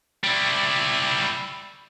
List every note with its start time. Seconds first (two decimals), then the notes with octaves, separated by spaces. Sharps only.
0.24 G3 E4